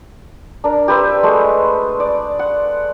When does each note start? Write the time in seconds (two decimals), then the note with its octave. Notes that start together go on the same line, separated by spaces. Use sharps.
0.64 D4 A#4
0.88 G4 B4 C5 E5
1.23 G#3 A3
2.00 D5
2.39 F#5